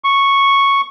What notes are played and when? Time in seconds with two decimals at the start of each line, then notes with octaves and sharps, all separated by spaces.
0.04 C#6